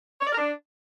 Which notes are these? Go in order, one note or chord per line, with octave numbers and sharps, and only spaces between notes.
C#5
D5
A#4
D4